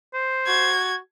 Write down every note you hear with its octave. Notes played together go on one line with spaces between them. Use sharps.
C5
F#4 G#6